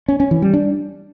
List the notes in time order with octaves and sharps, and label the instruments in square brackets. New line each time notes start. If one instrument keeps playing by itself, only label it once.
[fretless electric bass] C#4
C#4
E3
G3
D4